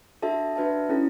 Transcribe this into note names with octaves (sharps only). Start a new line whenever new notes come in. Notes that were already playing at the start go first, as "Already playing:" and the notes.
D4 F#4 A4 E5 A5
D4 F#4 B4 E5 A5
C#4 E4 A4